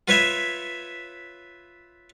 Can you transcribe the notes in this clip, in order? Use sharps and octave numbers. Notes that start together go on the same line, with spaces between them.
F4 B4 C#5 E5